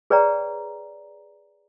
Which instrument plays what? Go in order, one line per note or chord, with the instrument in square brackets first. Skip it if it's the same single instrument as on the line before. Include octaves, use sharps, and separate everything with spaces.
[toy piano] G#4 B4 C#5 D5 G5 A#5